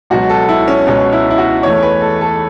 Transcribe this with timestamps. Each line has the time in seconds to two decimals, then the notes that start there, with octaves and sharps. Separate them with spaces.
0.10 C#2 B2 F#3 B3 F#4
0.29 A4
0.49 E4
0.68 C#4
0.87 C#2 B2 B3 C#4
1.13 E4
1.30 E4
1.38 F#4
1.63 E2 E3 A3 C#5
1.83 B4
2.02 A4
2.21 A4